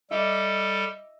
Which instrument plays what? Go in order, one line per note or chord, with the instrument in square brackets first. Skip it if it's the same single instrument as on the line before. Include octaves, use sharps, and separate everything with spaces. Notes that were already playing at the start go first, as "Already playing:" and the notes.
[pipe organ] G3 A4 [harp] D#5 E5 D6